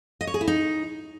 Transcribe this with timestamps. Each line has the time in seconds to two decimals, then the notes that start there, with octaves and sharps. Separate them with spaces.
0.21 D#5
0.27 C#5
0.34 G#4
0.41 E4
0.47 D#4